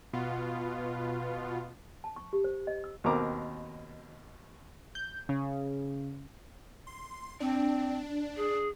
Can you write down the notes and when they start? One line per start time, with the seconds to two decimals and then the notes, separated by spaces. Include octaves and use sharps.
0.13 B2 B3 F4
2.04 A5
2.16 C#6
2.33 G4
2.44 C5
2.67 D#5
2.84 E6
3.04 D#2 B2 C4 A#4 A#5 D6
4.95 G6
5.29 C#3
6.87 C6
7.40 C4 D4
8.37 G#4